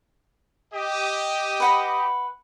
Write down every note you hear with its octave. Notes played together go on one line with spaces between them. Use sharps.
G4 D#5
B4 F#5 B5